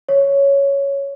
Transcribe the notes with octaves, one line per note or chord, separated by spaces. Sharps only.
C#5